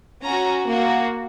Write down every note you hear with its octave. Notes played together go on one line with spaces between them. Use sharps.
C#4 F#4 A#5
A#3 F#4